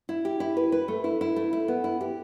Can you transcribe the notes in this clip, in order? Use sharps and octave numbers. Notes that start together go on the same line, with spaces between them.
E4
G4
E4
B4
B4
A3
E4
E4
A3
E4
B3
E4
G4